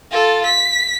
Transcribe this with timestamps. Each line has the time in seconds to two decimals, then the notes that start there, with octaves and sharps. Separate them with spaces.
0.11 F4 A4
0.46 B6